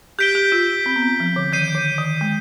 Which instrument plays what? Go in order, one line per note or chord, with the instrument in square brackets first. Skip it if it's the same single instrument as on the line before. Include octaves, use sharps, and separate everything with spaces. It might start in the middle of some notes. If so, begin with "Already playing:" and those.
[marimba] G4 [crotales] G6 B6 D7 G7
[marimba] G4
F4
C4
B3
C4
F3
D3
[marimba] D#3 [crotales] G6 C7 D#7
[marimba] D3
D#3
G#3